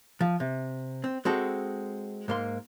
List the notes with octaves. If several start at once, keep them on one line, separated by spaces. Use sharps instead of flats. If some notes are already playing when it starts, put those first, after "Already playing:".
F3
C3
C4
G#3 C4 F#4 A4
G#2 A#3 C6